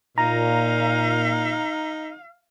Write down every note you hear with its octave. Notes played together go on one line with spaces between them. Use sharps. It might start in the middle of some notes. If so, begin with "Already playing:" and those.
A#2 D#4 F5 A#5